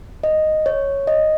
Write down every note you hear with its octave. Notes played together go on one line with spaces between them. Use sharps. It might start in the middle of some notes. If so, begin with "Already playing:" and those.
D#5
C#5
D#5